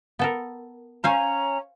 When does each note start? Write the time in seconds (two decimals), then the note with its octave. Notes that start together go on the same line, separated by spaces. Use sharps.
0.19 B3 A4 A#4
1.04 C#4 C5 F5 G#5 A#5